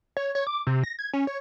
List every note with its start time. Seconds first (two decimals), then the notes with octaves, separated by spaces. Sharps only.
0.17 C#5
0.35 C#5
0.47 D6
0.67 C3
0.84 A#6
0.99 G#6
1.13 C#4
1.27 C#5